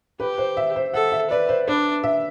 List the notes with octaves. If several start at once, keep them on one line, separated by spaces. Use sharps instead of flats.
G4 B4
C5
E5
C5
A4 F#5
E5
B4 D5
C5
D4 B4
E5